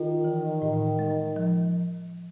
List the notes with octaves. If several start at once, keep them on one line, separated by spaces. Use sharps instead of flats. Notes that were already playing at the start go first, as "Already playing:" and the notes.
Already playing: D#3 F4
E3
A2
G#3
F3